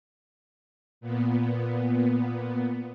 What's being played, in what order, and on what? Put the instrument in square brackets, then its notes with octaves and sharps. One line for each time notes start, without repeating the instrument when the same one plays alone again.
[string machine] A#2 B3